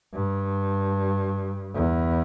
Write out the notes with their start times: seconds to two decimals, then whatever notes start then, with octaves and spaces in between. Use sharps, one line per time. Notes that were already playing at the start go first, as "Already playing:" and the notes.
0.14 G2
1.74 E2